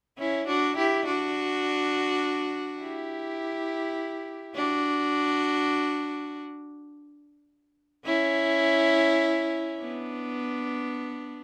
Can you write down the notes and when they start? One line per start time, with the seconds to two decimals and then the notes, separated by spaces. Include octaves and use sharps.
0.18 C#4 E4
0.47 D4 F#4
0.77 E4 G4
1.06 D4 F#4
2.80 E4 G4
4.55 D4 F#4
8.05 C#4 E4
9.80 B3 D4